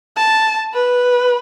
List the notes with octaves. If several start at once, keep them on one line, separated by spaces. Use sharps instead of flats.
A5
B4